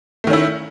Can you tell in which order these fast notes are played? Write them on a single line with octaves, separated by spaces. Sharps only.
A3 D#3 C#4 E4